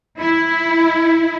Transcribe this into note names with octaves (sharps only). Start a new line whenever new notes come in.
E4